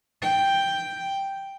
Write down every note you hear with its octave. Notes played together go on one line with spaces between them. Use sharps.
G5